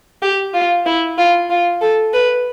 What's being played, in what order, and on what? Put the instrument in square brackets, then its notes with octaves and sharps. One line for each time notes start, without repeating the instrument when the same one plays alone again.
[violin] G4
F4
E4
F4
F4
A4
B4